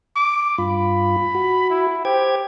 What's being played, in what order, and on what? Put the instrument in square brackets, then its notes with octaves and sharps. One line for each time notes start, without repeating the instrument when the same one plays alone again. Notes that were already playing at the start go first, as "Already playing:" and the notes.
[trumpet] D6
[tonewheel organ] G2 F4 [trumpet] B5
[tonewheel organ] F#4
[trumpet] E4
[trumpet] G4 [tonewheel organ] C5 G5 G#6